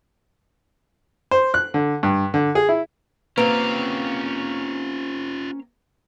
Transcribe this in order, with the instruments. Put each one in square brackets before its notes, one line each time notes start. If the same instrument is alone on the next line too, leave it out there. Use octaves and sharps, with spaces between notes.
[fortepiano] C5
F#6
D3
G2
D3
G#4
E4
[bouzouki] A#3 C4 [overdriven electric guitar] C#4 F5 [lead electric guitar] F4 G4 [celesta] B4